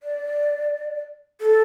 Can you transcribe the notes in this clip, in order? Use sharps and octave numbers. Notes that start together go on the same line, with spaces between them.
D5
A4